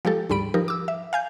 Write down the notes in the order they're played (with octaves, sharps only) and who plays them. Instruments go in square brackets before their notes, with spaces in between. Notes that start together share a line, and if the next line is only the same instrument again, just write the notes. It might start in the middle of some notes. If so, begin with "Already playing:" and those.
[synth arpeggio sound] F3 G#3 G4 A4
D2 G#2 G3 B5 D7
F3 D#4 G4 A#4
D6 E6
E5
F5 G#5 G6